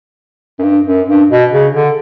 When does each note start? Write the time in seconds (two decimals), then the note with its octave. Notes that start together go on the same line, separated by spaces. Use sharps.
0.59 F#2
0.63 G2
0.86 F#2
1.08 G2
1.30 B2
1.52 C#3
1.74 D3